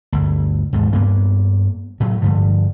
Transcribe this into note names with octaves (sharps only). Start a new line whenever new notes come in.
G1 D2
D#2 G#2 B2
G2 A#3 B3
A2 F#3
G2 D3 F3